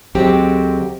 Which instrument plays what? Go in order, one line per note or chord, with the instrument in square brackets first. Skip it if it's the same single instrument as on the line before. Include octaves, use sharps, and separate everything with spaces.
[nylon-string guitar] D2 D3 F#3 G#3 C4 G4